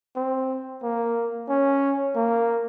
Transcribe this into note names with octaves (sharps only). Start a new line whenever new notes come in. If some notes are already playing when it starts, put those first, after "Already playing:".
C4
A#3
C#4
A#3